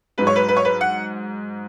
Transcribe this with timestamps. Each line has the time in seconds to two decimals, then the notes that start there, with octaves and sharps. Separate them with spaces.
0.18 G#2 F#3 B4
0.27 C#5
0.36 B4
0.48 B4
0.57 C#5
0.65 B4
0.81 F#5